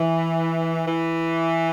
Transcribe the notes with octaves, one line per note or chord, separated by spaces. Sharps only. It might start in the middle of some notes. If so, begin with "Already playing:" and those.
Already playing: E3
E3